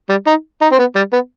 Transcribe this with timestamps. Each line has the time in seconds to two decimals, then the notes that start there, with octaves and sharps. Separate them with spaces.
0.09 G3
0.27 D#4
0.61 D#4
0.72 C4
0.79 B3
0.96 G3
1.13 B3